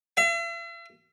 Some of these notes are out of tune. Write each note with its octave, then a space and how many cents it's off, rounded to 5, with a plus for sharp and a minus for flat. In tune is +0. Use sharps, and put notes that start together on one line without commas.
E5 +45